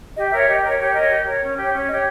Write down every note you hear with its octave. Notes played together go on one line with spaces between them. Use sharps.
G4 D#5
A#4 C#5 E5
G4 D#5
A#4 C#5 D#5
G4 C#5
A#4 C#5 D#5
G4
A#4 C#5
C#4
G4 C#5
C#4 C#5
G4 C#5 D#5